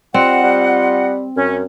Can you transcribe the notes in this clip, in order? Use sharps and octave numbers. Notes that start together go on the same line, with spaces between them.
G3 C4 F4 D#5 F#5
G3
F#2 C#4